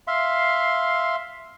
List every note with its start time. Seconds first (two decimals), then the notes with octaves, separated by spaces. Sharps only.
0.07 E5 F5 C6